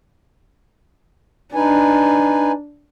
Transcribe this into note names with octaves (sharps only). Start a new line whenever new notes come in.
D4 D#4 B4 G#5